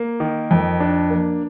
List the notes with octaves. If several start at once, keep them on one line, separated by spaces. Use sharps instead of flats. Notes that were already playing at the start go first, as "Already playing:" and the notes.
Already playing: A#3
D#3
F2
D4
A#3